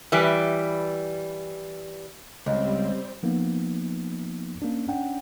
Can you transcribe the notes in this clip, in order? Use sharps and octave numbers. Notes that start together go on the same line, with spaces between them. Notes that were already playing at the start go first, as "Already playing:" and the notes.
E3 G3 B4
C#2 G3 C4
F3 A#3 B3 D#4
A#3 C#4 D4
C#4 D4 F#5 G5